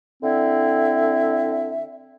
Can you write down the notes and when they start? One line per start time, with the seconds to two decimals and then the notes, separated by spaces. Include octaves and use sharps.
0.22 D3 C4 E4 E5